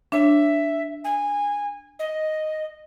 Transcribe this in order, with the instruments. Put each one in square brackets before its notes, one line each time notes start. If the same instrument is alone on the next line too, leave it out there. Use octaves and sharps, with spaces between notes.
[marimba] D4 C#5 [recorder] E5
[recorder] G#5
D#5